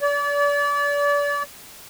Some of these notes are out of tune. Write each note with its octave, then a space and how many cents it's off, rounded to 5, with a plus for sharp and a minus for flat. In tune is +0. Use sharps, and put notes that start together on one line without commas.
D5 -35